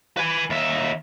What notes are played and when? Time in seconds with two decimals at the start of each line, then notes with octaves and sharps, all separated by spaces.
0.17 B4 G#5
0.50 D#2 E5